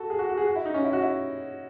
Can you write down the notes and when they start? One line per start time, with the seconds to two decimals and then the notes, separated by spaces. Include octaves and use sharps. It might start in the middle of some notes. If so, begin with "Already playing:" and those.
Already playing: F#4 A4
0.10 G#4
0.19 F#4
0.29 F#4
0.37 G#4
0.47 F#4
0.55 E4
0.66 D#4
0.74 C#4
0.84 E4
0.93 F#4
1.02 E4